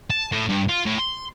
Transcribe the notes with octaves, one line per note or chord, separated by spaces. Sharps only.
A5
A2
G2
F4
A2
C6